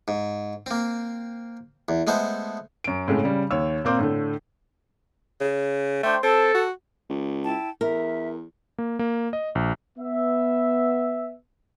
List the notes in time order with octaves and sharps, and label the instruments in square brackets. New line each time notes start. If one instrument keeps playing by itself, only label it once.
[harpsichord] G#2
A#3 C4
E2
G#3 A3 B3 C5
[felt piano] F#2 D7
A2 C#3 G#3 A3
C#3 G3
D#2 C#5 E6
A#2 A#3 C4 D6 G6
A2 D3 A3
[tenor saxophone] C#3
[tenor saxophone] A3 [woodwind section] D4 C5 G5
[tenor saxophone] C4 [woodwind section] A4
[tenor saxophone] F#4
[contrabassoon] C#2
[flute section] E4 G5 A5
[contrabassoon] E2 [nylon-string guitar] A#4 [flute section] E5
[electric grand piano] A#3
A#3
D#5
A#1
[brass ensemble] B3 E5